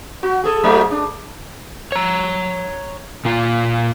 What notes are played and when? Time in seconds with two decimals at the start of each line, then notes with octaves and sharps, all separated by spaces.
0.23 F#4
0.44 G#4 A4
0.63 G#2 F#3 A3
0.91 D4
1.92 C#5 A#5
3.25 A#2 F4